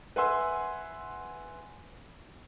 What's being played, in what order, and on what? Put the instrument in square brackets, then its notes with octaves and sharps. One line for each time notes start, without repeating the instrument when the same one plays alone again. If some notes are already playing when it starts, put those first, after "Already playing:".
[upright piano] B4 E5 F#5 G#5 C6 E6